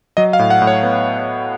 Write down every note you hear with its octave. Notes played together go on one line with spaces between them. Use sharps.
F#3 D#5
F5
A2
F#5
A2
C#5
B3